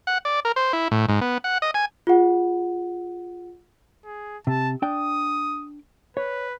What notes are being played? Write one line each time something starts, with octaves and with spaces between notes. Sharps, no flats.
F#5
D5
A#4
C5
E4
A2
G#2
B3
F#5
D#5
G#5
F4 G#4 F#5
G#4
C3 A5
D4 G5 D#6
B4 C#5